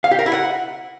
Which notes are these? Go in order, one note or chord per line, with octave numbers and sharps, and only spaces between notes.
F5
G4
A#4
E4
F#5